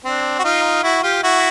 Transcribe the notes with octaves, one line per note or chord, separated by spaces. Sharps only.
C4 D4
F#4
D#4 F4
E4 F#4
F4 G4
E4 F#4